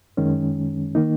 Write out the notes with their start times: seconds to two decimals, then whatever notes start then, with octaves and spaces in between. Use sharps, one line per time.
0.17 F#2 D#3 G#3 C#4
0.95 D#3 A#3 D#4